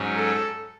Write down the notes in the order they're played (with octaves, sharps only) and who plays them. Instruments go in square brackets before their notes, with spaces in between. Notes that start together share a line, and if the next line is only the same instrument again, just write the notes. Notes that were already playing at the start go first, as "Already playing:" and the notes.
Already playing: [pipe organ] G#2 F#3 C#4
[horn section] A4